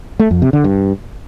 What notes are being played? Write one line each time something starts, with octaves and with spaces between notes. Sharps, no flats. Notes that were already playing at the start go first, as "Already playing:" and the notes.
A3
F2
C3
D3
G2